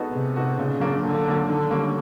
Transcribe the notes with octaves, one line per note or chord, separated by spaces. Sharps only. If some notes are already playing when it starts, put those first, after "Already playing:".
Already playing: G#3 B3 D#4 F#4 A4
C3 G#3
B3 D#4 F#4 A4
A#2 C#3
F#3 A#3 D4
A#2 D3
F#3 A#3 D4
D3 D#3
G3 A#3 C#4